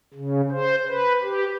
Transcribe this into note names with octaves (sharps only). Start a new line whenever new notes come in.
C#3
C5
B4
G4